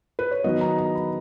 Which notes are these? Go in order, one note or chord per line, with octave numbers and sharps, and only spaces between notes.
B4
C#5
D#3 F#3 B3 D#5
A#5
A#5
B5